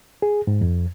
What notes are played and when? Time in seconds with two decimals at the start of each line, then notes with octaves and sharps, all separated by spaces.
0.22 G#4
0.47 G#2
0.61 F2